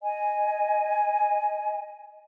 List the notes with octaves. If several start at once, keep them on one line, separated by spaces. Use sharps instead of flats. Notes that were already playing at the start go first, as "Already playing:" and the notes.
D#5 G#5